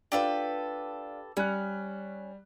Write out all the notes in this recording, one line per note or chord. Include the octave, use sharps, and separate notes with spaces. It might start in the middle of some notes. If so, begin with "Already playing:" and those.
D4 F4 G4 A4 B4
G3 C#4 F#6